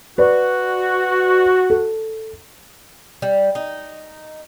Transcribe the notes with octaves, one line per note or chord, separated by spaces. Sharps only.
F#4 B4 D5
A4
G3
D#4